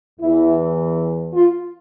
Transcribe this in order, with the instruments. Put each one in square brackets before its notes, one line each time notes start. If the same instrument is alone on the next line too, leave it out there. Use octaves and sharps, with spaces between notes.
[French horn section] E2 E3 E4
F4